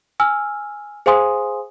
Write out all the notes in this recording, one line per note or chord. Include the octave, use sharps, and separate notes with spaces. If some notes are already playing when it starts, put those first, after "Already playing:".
G#5 E6 F6
G#4 C5 F5 G#5 C6 D#6